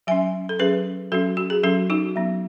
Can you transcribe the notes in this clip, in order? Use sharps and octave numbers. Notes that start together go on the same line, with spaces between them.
F#3 C#4 E5 G#5
A4
F#3 C#4 G#4 B4
F#3 C#4 F#4 A4
F#4
G#4
F#3 C#4 F#4 A4
D#4 F#4
F#3 B3